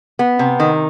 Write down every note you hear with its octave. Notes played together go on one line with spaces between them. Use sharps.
B3
C3
D#3